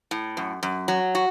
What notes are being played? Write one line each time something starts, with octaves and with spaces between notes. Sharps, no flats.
A2
F#2
F#2
F#3
F#4